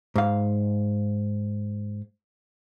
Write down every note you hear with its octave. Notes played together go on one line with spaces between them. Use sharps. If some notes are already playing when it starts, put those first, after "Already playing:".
G#2 F5